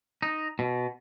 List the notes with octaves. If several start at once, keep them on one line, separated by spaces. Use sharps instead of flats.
D#4
B2